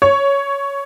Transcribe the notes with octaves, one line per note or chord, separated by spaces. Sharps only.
C#5